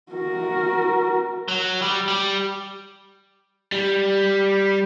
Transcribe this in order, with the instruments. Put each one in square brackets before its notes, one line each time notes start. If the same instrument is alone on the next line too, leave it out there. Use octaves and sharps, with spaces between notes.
[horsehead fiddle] F#4 A#4
[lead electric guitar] F#3
G3
G3
[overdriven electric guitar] G3